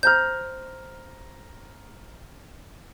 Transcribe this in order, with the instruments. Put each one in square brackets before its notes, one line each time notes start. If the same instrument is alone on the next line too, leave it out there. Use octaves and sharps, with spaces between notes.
[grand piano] C5 A#5 F6 [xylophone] G6